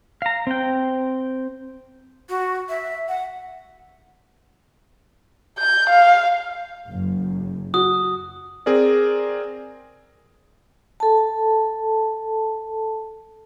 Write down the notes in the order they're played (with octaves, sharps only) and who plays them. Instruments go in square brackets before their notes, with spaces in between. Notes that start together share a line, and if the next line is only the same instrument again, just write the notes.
[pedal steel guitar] F5 A#5
C4 G5
[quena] F#4
E5
F#5
[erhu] G6
F5
[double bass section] F#1 F#2
[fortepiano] F#4 [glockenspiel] D#6
[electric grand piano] C4 G#4 A#4 D5
[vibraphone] A4 A5